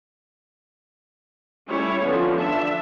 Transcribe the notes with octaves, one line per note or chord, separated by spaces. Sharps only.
G3 A3 C#4 E4 C#5
D3 E3 F3 B3 C#4
D4 E5